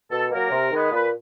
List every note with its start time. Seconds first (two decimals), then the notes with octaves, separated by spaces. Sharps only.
0.11 B2 A4
0.31 F#3 A#3 A#4
0.51 C3
0.71 D#3 G#3 B3
0.91 A#2 B4